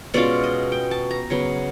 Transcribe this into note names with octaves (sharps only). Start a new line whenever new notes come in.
B2 G#3 C#4 F4 D5
D#5
G5
A5
A#5
C#3 F#3 B3